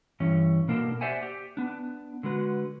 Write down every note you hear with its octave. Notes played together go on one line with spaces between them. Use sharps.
G2 E3 C#4
B2 A#3 D4 A4
G4 C5 D5 E5 F#5 G#5
G4
B3 D4
D3 G#3 F#4 B4